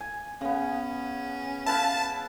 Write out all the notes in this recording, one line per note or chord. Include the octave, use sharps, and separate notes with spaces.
G#5
C#3 B3 C#4
E4 B4 F5 A5